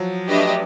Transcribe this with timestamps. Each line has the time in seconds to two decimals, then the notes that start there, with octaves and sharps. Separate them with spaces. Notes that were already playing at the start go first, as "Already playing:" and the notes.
Already playing: F3 F#3
0.28 A3 D4 G4 B4 D#5